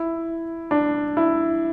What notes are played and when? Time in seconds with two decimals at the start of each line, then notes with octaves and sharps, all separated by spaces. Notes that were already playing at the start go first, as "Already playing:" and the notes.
Already playing: E4
0.71 D4
1.17 E4